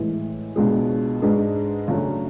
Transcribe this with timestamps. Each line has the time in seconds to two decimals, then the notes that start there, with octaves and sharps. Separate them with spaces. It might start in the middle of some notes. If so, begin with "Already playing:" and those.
Already playing: A2 E3 G#3
0.56 C#2 B2 G#3 D4 G#4
1.22 G#2 G#3 D4 G#4 B4
1.88 F#2 C#3 F#3 A3 D4